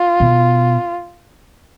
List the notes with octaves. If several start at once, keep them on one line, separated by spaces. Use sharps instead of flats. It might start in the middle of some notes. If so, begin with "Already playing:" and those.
Already playing: F4
B2